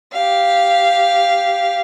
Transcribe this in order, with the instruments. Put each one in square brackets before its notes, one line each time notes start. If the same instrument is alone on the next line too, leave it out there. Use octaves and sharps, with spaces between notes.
[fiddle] G4 F5